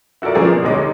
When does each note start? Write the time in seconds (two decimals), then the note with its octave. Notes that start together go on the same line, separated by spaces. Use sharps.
0.22 E4 F#4 A4 A#4 D5
0.34 F3 B3 C#4 G#4 A#4 D5
0.51 B2
0.64 D2 G3 G#3 C#5 D#5 D6
0.78 D#4